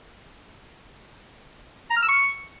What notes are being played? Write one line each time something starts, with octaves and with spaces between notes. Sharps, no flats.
A#5
F6
E6
C#6